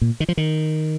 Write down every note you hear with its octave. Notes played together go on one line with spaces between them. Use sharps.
A#2
D#3
F3
D#3